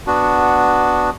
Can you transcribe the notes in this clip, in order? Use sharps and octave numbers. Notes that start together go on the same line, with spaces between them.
B3 D4 F#4